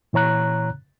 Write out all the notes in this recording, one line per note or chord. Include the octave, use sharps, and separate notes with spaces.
A#2 E3 C#5 A#5 F#6